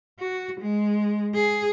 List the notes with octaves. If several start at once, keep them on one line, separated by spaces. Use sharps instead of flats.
F#4
G#3
G#4